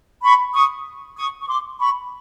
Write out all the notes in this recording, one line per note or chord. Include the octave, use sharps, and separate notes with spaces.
B5 C#6
C#6 D#6
C#6 D#6
C#6
C6 D6
B5 C#6